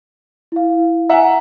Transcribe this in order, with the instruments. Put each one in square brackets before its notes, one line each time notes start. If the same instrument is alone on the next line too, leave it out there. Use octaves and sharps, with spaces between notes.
[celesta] E4 F5
[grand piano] E5 F#5 [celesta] G#5 A#5